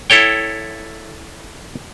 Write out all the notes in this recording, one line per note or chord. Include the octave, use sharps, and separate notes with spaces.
E4 A4 C#5 G5